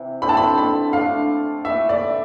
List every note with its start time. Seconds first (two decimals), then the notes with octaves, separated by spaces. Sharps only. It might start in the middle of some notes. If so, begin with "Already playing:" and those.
Already playing: C3 E3
0.22 D3 G3 C4 E4 B5
0.29 A5
0.37 B5
0.58 B5
0.93 A3 D4 A4 F5
1.65 E3 A3 E4 A4 E5
1.89 D5